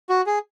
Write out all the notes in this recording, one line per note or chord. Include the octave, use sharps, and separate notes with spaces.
F#4
G#4